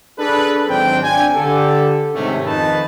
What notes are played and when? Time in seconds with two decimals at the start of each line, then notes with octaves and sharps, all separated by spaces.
0.18 D4 G#4 A4 B4
0.67 G#1 F#3 C4 D4 G5
1.02 D4 G5 G#5
1.35 D3 G4 A4
2.14 G#2 C3 D#3 A3 C#4
2.45 F2 D#3 D#4 B4 A5